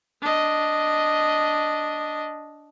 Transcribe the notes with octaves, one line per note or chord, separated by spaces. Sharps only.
D4 D#5